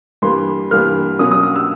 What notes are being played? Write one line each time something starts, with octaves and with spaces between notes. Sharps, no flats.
G2 E3 G3 A#3 C6
G2 E3 G3 A#3 F6
B2 F#3 A#3 C#4 D#6
D#6
D#6
E6